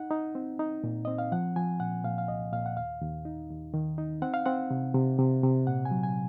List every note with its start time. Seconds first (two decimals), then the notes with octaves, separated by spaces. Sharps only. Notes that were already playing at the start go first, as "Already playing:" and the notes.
Already playing: D#4 F#5
0.11 D#4
0.35 C4
0.59 D#4
0.84 A#2
1.05 C4 D#5
1.18 F5
1.32 F3 F#5
1.56 F3 G#5
1.80 A#2 F#5
2.04 A#2 F5
2.18 F5
2.28 C2 D#5
2.53 A#2 F5
2.66 F#5
2.77 D#2 F5
3.01 D#2
3.25 D#4
3.50 D#2
3.74 D#3
3.98 D#4
4.22 C4 F#5
4.34 F5
4.46 C4 F#5
4.71 C3
4.94 C3
5.19 C3
5.43 C3
5.67 A#2 F#5
5.85 G#5
5.91 F#3
6.03 G#5